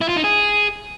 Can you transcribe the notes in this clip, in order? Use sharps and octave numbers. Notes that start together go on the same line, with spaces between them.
E4
F4
D#4
G#4